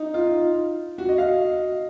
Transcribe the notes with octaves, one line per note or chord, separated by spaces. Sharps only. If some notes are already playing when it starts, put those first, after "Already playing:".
Already playing: D#4
F4
F#4
D#5
F5